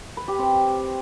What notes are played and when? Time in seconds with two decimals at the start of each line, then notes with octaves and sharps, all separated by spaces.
0.17 B4
0.28 G4
0.39 C4